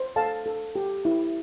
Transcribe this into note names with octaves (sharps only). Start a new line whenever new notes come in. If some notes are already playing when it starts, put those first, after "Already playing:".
Already playing: C5
A4 F5 A5
A4
G4
E4